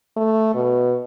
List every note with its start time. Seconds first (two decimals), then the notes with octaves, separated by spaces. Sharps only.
0.16 A3
0.54 B2